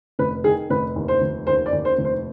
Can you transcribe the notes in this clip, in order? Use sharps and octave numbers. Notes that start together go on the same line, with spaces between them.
F1 B4
D#3 G#4
F1 B4
D#2
C5
F1
D#2 C5
D5
D#2
C5
F1
C5